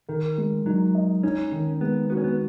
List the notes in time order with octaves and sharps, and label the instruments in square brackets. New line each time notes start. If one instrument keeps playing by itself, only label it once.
[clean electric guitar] D#3 [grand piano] A#4
[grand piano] G#3
[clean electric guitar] F#3 [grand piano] D#4
[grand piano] D#5
[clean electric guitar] C#4 [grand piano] D#4
[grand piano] D#3
[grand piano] G#3 [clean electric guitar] B3
[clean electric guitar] B3 [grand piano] F#4
[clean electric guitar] C#4
B3